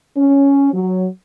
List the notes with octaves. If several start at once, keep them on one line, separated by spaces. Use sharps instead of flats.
C#4
F#3